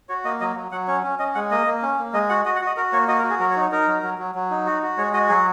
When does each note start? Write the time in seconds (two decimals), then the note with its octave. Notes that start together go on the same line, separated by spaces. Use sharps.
0.09 F#4 C#5
0.24 A#3 D#5
0.41 F#3 D#5
0.56 F#3
0.72 F#3 F#5
0.88 C#4 C#5
1.04 C#4
1.19 C#4 D#5
1.35 G#3 F#5
1.51 A#3 D#5
1.67 A#3
1.82 C#4
1.99 A#3
2.13 G#3 D#5
2.30 F#4 F#5
2.45 F#4 D#5
2.56 F#5
2.62 F#4 D#5
2.77 F#4 A#4
2.93 A#3 C#5
3.08 F#4 D#5
3.19 A#4
3.24 F#4
3.30 G#4
3.40 F#3 A#4
3.50 C#5
3.56 D#4
3.61 C#5
3.72 D#4 A#4
3.88 F#3
4.03 F#3
4.18 F#3
4.35 F#3
4.50 D#4
4.67 F#4
4.83 F#4
4.98 G#3 C#5
5.13 F#4 D#5
5.29 F#3 G#4